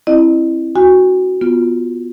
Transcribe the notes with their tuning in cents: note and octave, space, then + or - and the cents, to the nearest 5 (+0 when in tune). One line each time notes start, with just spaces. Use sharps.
C4 +20 E4 +0 D#5 -35
F#4 +0 G#5 -40
B3 +0 F4 +0